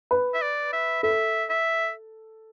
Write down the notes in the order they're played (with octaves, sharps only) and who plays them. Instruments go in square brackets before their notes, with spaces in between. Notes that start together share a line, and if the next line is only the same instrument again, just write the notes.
[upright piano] B4
[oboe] E5
D5
E5
[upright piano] A4 [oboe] E5
[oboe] E5